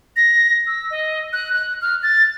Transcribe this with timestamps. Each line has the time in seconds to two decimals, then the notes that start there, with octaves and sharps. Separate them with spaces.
0.16 A#6
0.67 E6
0.90 D#5
1.33 F#6
1.53 F#6
1.82 F6
2.03 A6